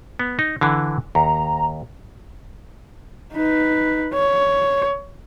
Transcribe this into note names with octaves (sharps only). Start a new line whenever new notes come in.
B3
D#4
D3 E3
D#2 A#5
D#4 B4
C#5